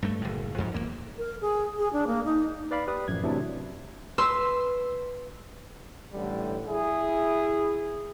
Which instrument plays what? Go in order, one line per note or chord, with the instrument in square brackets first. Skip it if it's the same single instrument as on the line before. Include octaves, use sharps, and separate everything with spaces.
[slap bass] G2 A3
F#1 A2
F2 G#2
A1 A#2 A#3
[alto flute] A#4
G#4
G#4
D4
A#3
D#4
[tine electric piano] B4 D5 F5 B5
G4 B4 D5 D#6
A1 F#2 F3 G#6
C3 E3 F#3 A3 D4
[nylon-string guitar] B4 [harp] C6 E6
[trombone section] A1 A2 D3 G3
E4 G#4